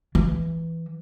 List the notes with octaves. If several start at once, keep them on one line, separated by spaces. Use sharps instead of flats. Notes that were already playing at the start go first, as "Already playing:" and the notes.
E3